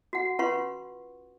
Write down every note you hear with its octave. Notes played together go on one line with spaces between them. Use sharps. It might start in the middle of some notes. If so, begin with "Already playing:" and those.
F#4 F#5
C#4 F4 B4 F#5 C6 C#6